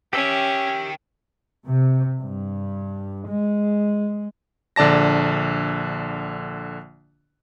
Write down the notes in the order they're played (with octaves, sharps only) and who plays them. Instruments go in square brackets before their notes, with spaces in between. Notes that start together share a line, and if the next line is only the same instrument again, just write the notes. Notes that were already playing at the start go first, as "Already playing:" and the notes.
[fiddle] C#4 [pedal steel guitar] G4 E5 [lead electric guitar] A#4 G5
[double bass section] C3
G2
G#3
[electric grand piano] A#1 D3 D5 A5 A#6